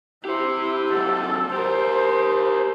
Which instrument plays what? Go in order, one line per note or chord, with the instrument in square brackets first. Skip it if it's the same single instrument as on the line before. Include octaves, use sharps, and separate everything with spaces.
[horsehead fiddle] E4 [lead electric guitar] G4 C5
[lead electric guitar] C3 F#3 [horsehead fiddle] A4
[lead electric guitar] G4 A#4 [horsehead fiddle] C5